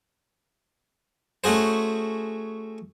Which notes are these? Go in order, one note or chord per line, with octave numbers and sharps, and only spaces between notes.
A3 C#4 F#4 G#4 C5